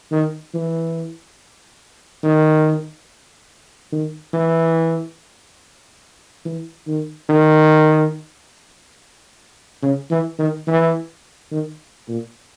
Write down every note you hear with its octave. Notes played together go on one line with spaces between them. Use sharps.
D#3
E3
D#3
D#3
E3
E3
D#3
D#3
C#3
E3
D#3
E3
D#3
A#2